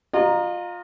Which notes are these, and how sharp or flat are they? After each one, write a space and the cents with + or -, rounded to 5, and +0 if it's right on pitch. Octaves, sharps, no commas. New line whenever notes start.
F4 +20 D#5 -30 A#5 +0